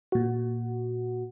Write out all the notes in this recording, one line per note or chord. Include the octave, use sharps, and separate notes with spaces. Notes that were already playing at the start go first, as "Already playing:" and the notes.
A#2 F#4